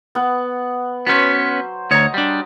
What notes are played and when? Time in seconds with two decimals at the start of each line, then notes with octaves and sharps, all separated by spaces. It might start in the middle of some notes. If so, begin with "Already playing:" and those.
0.15 B3 F#5
1.07 F#3 B3 C#4 C5
1.91 D2 C#5 D#5 A#5
2.14 G3 D4